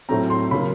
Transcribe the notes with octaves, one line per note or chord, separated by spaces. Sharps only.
A2 F#3 A3 C4 A#5
C6
C#3 F#3 A#3 B5